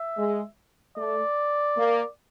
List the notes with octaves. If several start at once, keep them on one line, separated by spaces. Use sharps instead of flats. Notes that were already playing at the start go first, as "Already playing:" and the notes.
Already playing: E5
G#3
A3 D5
A#3